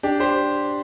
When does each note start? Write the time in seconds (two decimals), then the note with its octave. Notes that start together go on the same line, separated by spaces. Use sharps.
0.03 D4 G4
0.20 G4 C5